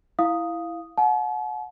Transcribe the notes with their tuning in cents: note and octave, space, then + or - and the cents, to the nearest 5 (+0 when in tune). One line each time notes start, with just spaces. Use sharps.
E4 +0 F5 +0 D#6 +0
F#5 -25 A5 -45